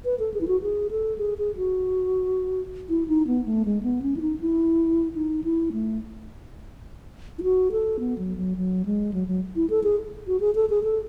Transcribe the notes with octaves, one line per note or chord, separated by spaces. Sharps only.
B4
A4
G#4
E4
F#4
G#4
A4
G#4
G#4
F#4
E4
D#4
B3
A3
G#3
B3
C#4
E4
D#4
E4
D#4
E4
A3
E4
F#4
A4
B3
F#3
F#3
F#3
G#3
F#3
F#3
E4
A4
G#4
F#4
G#4
A4
G#4
A4